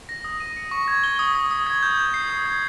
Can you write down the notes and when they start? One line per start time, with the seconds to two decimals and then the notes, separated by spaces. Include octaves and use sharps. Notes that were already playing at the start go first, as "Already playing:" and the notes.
0.09 A#6
0.24 D#6
0.40 D#7
0.57 C#7
0.71 C#6
0.88 G#6
1.04 G7
1.19 D#6
1.35 D#6
1.51 D#6
1.67 G#6
1.83 G6
1.98 G6
2.14 C7
2.30 D#6
2.46 G#6